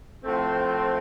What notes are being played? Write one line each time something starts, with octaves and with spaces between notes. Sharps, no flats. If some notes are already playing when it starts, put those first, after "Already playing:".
A2 F3 A3 C4